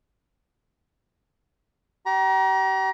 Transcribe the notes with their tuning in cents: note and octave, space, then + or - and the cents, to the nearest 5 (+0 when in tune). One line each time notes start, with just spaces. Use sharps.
G4 -40 A#5 +30